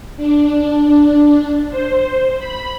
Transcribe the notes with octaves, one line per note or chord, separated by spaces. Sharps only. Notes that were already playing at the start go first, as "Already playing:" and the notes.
D4
C5
B5